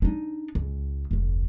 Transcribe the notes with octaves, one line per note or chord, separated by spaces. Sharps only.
D4 D#4
C#2
F1 D2